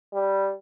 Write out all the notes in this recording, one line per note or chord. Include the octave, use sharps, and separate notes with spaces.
G3